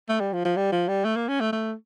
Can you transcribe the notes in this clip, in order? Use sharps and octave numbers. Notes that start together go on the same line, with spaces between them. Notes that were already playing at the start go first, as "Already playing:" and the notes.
A3
G3
F3
F3
G3
F3
G3
A3
A#3
C#4
A3
A3